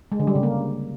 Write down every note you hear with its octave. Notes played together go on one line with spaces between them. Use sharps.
G#3
D3
G3
C#3
A#3